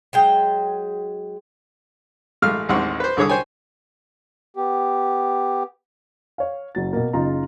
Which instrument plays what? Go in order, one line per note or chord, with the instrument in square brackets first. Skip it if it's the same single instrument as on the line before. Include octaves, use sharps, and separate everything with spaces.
[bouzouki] F#3 G#3 G5
[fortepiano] A1 G#3 A3 F5 F6
A1 D#2 G#3 C4 F#5
B4 C5
C2 D3 G#4 C#5 D6 D#6
C5 C#5 G5 G#5
[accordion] B3 G4
[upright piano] C#5 F5
F#1 F#3 A6
B2 A#3
F#1 C#3 D#4 F4 A#5